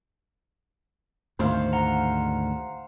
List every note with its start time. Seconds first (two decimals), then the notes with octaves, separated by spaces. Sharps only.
1.39 D2 G#2 D#3 C5 F5
1.73 F#5 A#5